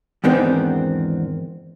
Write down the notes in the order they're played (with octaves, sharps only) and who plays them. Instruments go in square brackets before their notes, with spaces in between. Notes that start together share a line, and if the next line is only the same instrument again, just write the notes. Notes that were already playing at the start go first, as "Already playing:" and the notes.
[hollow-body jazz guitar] E2 G#2 D#3 B3 C4 D4